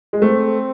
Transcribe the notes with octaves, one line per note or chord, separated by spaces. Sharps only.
G#3
A3 C4